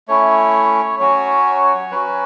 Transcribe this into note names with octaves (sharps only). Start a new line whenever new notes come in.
A3 C#4 E4 C#5
F#3 C#4 F#4 C#5
F#3 C#4 F#4 B4